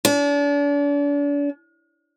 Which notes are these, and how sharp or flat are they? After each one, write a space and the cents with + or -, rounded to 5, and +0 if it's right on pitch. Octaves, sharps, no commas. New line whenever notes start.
D4 -40